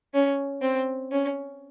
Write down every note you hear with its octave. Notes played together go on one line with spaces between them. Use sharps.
C#4
C4
C#4